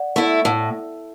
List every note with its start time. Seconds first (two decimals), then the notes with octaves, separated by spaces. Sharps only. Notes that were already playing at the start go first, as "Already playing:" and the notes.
Already playing: D5 F#5
0.16 A3 E4
0.45 A2